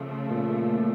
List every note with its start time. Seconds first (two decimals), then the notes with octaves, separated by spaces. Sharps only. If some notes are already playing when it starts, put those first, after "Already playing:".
Already playing: C#3 F3 A3
0.31 A#2